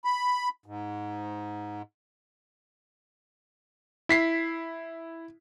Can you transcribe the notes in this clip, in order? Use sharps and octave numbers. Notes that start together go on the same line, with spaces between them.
B5
G#2
E4 B6 C7